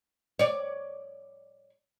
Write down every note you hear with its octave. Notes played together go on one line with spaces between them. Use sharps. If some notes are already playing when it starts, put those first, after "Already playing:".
C#5 D5